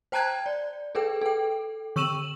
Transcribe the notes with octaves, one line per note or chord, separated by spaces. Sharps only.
C5 G5 A5 A#5 F#6 G#6
D5
G#4 A4 B4 G5
A4 G5
D3 C#6 E6 D#7 E7 F#7